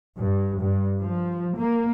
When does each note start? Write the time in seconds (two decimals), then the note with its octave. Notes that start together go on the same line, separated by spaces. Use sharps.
0.19 G2
0.60 G2
1.01 F3
1.58 A#3